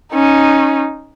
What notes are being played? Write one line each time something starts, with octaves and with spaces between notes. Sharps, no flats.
C#4 D#4